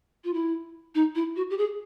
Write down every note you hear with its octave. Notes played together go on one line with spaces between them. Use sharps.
F4
E4
D#4
E4
F#4
G4
G#4